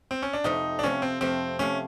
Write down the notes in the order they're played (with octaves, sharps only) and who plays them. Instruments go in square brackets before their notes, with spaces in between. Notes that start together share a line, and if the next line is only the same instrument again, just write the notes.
[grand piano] C4
C#4
D4
[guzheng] F2 C3 F3 A3 [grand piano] D#4
[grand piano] D4
[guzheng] F2 C3 F3 A3 [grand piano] C#4
[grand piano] C4
[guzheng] F2 C3 F3 A3 [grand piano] C4
[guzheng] C3 F3 A3 [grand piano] C#4